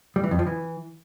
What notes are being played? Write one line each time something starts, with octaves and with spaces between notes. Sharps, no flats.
G3
E3
F2
F3
E3